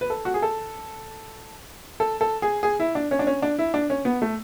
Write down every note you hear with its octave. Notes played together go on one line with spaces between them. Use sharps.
B4
A4
F#4
G#4
A4
A4
A4
G#4
G#4
E4
D4
C#4
D4
C#4
D4
E4
D4
C#4
B3
A3